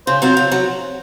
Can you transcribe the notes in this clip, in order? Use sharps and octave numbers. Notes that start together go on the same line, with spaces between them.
C#3 C5
F#3 C4 F4
C#3
F#3